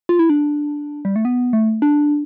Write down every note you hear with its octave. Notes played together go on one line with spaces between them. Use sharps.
F4
E4
D4
G3
A3
B3
A3
D4